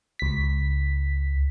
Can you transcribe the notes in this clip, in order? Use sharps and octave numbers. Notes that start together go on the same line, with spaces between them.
C#2 B6